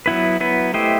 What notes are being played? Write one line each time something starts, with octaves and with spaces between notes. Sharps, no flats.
F#3 B3 E4 B4
F#3 B3 E4 B4
A3 E4 G4 C5 D#5